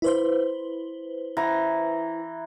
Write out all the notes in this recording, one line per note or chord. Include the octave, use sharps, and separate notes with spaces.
E4 B4 C5
E3 A#5